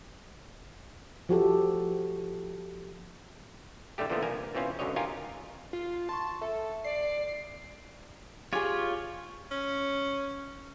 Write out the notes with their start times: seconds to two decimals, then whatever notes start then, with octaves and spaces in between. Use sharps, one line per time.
1.29 F3 F#4 G4 A4
3.98 A2 D3 G3 A3 G4
4.10 A#2 D3 E3 F3 A3 B3
4.22 C2 A#3 A#4 G#5
4.55 B2 E3 C4 C#4 F4
4.79 C#2 F#2 D3 F#3 C#5 D#5
4.96 D#4 F4 G4 A#4 G#5
5.73 F4
6.09 A5 C6 C#6
6.41 A4 E5 A5
6.84 D5 C7
8.53 F4 G4 G#4 C#5
9.51 C#4